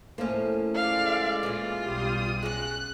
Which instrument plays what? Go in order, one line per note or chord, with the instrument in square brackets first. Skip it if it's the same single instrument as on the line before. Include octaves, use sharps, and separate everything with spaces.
[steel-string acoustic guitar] A2 A3 A#3 [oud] F3 C#4
[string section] G#3 D5 [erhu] F5
[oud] A#2 C#3 E3 [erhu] F4
[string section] B1 G3 D#6
[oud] G#3 C#4 [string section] F#6